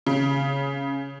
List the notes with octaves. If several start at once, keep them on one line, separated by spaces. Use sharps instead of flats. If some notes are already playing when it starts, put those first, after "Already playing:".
C#3